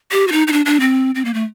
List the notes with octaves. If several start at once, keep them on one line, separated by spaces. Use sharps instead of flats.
G4
F#4
D#4
D#4
D4
D4
C4
C4
A#3
A3